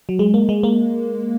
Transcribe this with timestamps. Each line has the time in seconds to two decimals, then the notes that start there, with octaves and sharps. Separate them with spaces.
0.09 F#3
0.19 G#3
0.34 A#3
0.49 G#3
0.63 A#3